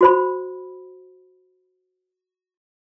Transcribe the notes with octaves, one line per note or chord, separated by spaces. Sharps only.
F#4 C5 B5